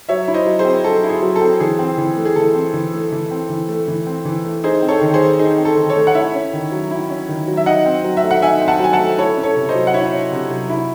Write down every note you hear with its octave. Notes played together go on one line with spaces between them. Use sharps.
F#3 C#5 E5
E4
C5 D#5
F#3
G#4 C5
C4
F#3 A4
E4
G#4
F#3
A4
C4
E3 G#4
C4
E3
A3
G#4
E3 A4
C4
E3
A3
E3
C4
E3
A3
E3
C4
E3
A3
D#4 G#4 C5
C4
A4 C#5
D#3
G#4 C5
A3
D#4 G#4
C4
A4
D#3
A4 C#5
A3
F#5
E4 C#5 E5
C#4
D#3
F#3
E4
C#4
D#3
F#3
E5
D#4 D#5 F#5
C4
F#3
E5
A3
F#5
D#4 E5 G#5
C4
F#5 A5
F#3 G#5
F#5 A5
A3
E4 A4 C#5
C#4
A4 C#5
C3
C5 D#5
F#3
F#5
E4 C#5 E5
C#4
C3
F#3
E4